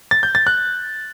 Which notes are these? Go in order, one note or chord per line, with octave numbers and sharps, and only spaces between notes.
A6
G6
A6
F#6